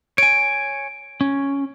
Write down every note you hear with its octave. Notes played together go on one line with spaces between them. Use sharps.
C#5 G#5 D7
C#4